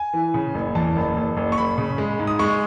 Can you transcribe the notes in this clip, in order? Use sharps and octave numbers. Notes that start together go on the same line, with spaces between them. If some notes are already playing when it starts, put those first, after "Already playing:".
Already playing: G#5
E3
C#3
F#1
E2 A5
F#1
F#1
F#1
C#6
F#1 B5
C#3
G#3
G#2
D#6
G#3 C#6